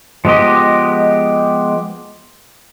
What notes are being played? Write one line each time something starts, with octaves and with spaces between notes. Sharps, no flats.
F3 G#3 B3 G4 D#5